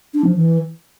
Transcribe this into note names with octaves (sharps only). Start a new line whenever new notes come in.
D4
F3
E3